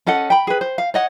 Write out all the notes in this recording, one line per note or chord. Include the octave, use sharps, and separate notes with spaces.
C#4 A4 D#5 F#5
G5 B5
G#4 B4
C5
F5
C#5 D#5 F#5